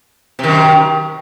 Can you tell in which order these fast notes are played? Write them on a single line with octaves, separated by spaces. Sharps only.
C3 D#3 F#2